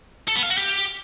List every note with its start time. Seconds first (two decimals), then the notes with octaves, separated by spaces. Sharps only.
0.28 A4
0.35 B3
0.43 F5
0.50 F#4
0.57 G4